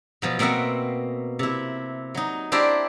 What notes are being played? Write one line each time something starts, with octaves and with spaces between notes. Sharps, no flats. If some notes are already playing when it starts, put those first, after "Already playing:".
B2 F3 F#3
B2 A#3 C4 E5 F#5
C3 E4
F#3 D#4
D4 E4 G4 C5 D5 A#5